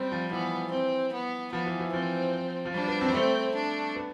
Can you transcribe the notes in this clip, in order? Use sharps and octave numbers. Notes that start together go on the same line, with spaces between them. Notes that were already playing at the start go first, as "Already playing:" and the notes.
Already playing: G3 C4
F3
E3 B3
C4
B3
F3 B3
E3
E3
F3 C4
F3
G3 D4
B3
C4
G3
A3 C4
D4
B3